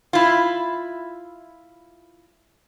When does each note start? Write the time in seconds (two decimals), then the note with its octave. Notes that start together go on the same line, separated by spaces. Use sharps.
0.13 E4 F4